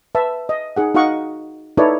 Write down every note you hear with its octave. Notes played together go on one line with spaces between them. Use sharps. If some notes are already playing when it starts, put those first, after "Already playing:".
B4 E5 A5
D#5
D#4 G#4 F#5
D#4 F#4 D#5 F5 F#5 C#6
D#4 E4 A4 B4 C#5 D5